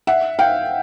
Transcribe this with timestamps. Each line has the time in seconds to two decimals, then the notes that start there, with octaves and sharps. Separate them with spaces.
0.07 E5 F#5
0.39 F5 G5